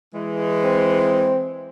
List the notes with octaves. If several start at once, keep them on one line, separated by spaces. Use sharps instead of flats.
E3 G#3
C4